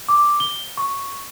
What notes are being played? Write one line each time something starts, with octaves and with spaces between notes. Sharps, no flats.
D6
G7
C#6